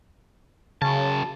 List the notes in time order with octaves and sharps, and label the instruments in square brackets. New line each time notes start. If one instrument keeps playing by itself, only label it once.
[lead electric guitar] F#2 A5 [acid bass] C#3